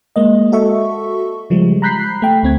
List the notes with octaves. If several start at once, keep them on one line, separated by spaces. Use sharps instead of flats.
G#3 A#3 D#5
F#4 A4 E5 C#6
C#3 F3 G3 G#3
A#5 B5 F#6 G6 B6 C7
A3 G5
D2 C4 G#6